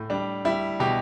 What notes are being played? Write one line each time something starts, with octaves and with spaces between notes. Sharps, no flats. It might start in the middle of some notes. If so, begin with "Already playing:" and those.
Already playing: A2
G3 D4
G3 E4
B2 G4